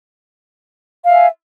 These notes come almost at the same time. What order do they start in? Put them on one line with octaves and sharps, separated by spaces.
F5 E5 G#5